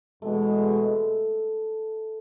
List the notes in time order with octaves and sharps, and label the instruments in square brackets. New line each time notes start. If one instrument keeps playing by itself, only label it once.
[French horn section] E2 B2 G#3 [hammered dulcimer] A3